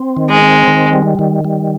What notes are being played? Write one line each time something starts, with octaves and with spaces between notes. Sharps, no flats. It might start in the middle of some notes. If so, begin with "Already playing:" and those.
Already playing: C4
D#3
G#3
C4
D#3
G3
D#3
G3